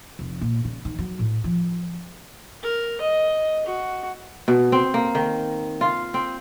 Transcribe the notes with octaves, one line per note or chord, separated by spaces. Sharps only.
F1
A#2
C#3
D#3
F#3
A2
F3
A#4
D#5
F#4
B2
C4
A#3
D#3
F4
C4